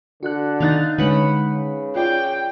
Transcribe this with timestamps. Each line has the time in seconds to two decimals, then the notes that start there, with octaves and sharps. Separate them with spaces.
0.23 D3 F#4 F#5 F#6
0.60 D#3 D#4 F5 A#5 F#6 A6
0.98 D3 G#3 C#4 B4 F#5 B5
1.44 C#3
1.96 F4 D5 G5